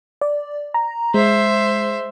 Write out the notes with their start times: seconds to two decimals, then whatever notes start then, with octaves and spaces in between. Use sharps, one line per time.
0.21 D5
0.74 A#5
1.14 G#3 C5 E5